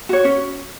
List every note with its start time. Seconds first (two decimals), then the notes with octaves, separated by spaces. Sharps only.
0.09 F#4 C#5
0.25 C#4